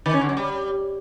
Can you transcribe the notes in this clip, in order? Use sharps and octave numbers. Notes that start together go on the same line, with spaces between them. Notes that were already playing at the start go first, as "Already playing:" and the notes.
D#3
C#4
D3
F#3
G3